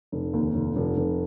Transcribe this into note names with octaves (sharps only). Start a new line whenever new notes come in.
F1
D#2
F1
F1
F1